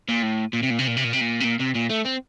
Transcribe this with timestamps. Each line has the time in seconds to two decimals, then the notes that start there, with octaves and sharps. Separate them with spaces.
0.08 A#2
0.22 A2
0.53 A#2
0.63 C3
0.71 A#2
0.79 C3
0.87 A#2
0.97 C3
1.04 A#2
1.13 C3
1.21 A#2
1.41 C3
1.45 A#2
1.60 C3
1.75 A#2
1.90 A3
2.06 C4